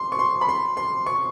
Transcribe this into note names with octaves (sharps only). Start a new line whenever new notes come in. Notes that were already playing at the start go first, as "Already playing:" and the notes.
Already playing: C6
C#6
C6
B5
C6
C6
C#6